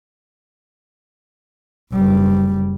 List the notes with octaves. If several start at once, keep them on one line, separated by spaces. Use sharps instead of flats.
F#1 G3